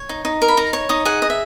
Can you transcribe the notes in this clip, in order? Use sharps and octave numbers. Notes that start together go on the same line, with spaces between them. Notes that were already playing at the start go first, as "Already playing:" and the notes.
Already playing: C#5
D#4
D#4
A#4
B5
D#4 A#5
C#5 C#6
D#4 D#6
G#4 F#5
D#5
E5